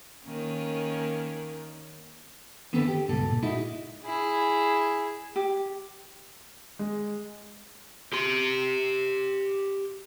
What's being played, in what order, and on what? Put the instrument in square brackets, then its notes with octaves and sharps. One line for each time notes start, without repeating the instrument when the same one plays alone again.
[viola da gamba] D#3 A#3 C#4
[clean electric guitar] D3 D#3 B3 C4 A4 B4
G4
C#2 G2 B2 A4
A#2
G#3 D#4 E4 F#4
[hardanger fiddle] E4 G#4
[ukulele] G4
[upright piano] G#3
[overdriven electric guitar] G4 C6